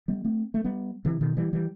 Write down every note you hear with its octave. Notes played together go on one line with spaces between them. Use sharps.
G3 B3
A3 C4
A3
G3 B3
C3 E3
B2 D#3
E3 G3
E3 G3